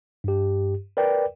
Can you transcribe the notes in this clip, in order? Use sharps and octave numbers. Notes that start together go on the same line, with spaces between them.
G2 G4
A#4 B4 D5 G5